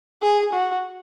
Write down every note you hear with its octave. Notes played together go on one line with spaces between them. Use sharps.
G#4
F#4